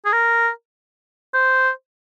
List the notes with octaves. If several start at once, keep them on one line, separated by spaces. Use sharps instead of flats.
G#4
A#4
C5